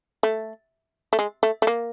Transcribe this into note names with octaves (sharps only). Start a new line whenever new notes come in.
A3
A3
G#3
A3
A3
A#3